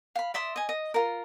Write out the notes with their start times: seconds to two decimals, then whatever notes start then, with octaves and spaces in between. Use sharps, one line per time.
0.16 F5 B5
0.34 D5 E5 C6 D#6
0.56 D#5 G#5
0.69 D#5
0.94 F4 A#4